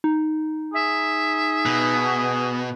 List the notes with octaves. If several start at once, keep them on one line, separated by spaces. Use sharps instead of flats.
D#4
G#4 E5
B2